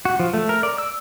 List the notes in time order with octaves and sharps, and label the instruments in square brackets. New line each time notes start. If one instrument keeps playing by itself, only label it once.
[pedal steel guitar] F#4
F3
A3
A#4
D5
E6